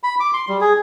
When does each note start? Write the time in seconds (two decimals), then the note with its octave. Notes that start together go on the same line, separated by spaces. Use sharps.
0.03 B5
0.20 D6
0.33 C6
0.49 G3
0.61 G#4